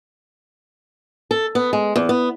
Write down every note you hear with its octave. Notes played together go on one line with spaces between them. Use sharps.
A4
B3
G#3
E2
B3